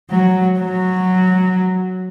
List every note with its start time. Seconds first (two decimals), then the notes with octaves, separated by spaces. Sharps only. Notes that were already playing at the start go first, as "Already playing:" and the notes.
0.10 F#3
0.58 F#3